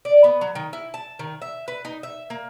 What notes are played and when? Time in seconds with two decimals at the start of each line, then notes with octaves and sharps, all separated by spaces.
0.05 D5
0.24 B3
0.41 F#3
0.55 D#3
0.73 E4
0.94 A5
1.19 D#3
1.42 E5
1.68 B4
1.85 D#4
2.03 E5
2.30 A#3